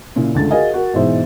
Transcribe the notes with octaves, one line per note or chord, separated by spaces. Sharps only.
A#2 C#3 E4
C#2 D3 A3 A6
F#4 G#4 A#4 D#5 F5 G#5
F#4 A#4
G#2 B2 E3 G#4 C5 E5